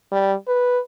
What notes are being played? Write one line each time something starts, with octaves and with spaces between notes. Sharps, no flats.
G3
B4